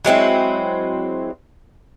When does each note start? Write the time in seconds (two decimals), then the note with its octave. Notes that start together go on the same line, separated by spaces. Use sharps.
0.04 F#3 G#3 C4 E4